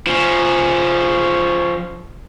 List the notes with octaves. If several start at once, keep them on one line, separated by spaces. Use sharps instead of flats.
F3 C#4